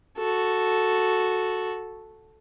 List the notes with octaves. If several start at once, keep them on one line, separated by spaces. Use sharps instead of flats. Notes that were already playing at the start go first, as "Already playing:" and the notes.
F#4 A4